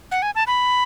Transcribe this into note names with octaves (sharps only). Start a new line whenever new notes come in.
F#5
G#5
A5
B5